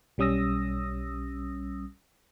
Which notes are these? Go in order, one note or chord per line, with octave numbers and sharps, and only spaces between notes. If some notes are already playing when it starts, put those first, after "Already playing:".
B1 G3 C#4 D#6 E6 A#6